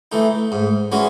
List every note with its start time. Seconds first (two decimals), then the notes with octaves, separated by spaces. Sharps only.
0.12 E3 A3 D#4
0.52 G#2
0.92 E3 G#3 C#4 F#4